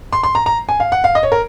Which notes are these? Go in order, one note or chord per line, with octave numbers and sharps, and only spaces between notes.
C6
C6
A#5
A#5
G#5
F5
F#5
F5
D#5
C#5
A#4